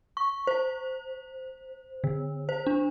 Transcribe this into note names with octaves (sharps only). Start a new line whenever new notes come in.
C#6
C5
D3
C5
D4